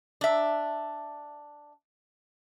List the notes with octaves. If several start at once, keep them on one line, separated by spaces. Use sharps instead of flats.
D4 E5